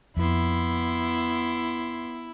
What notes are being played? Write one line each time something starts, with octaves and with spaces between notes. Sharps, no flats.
F2 B3 E4 C6